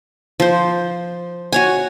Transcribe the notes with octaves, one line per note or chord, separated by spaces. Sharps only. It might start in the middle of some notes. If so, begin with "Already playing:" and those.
F3 C5
F#4 C#5 G#5